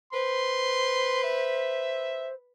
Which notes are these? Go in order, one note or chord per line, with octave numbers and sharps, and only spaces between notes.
B4 C5 C6
E5